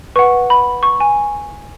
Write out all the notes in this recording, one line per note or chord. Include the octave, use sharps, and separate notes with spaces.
B4 F#5 C#6
B5
C#6
G#5